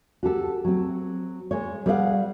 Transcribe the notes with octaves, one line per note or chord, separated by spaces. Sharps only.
F#4 G4 A4
F#3 C4
G#3 C#5
G3 G#4 B4 D5 F5 F#5